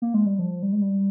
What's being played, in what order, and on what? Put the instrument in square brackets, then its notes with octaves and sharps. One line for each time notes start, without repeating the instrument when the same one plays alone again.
[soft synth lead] A#3
G#3
G3
F3
G3
G#3
G3